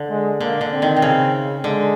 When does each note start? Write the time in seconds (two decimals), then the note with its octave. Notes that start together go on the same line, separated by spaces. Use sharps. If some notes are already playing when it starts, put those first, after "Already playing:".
Already playing: D3
0.10 G#3
0.41 D3 A#3
0.61 D3
0.71 C4
0.82 D#3
0.97 C3
1.02 C#3
1.64 D3 G#3